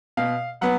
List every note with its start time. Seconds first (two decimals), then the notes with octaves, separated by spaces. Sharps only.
0.17 B2 F5
0.61 F#3 B3 F#5